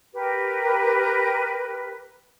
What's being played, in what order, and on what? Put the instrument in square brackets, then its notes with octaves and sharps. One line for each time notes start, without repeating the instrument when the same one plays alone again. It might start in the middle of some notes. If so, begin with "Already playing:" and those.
[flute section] G4 A#4 B4